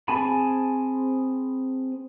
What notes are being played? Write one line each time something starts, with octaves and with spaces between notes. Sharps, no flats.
C4 G#4 G#5 A5 B5